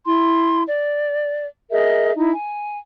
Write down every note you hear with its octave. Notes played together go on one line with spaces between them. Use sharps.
E4 C6
D5
G#4 A#4 D#5 E5
D#4 E4
G#5